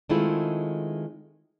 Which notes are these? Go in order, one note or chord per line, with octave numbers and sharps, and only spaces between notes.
D#3 G#3 A3 C4 E4 F4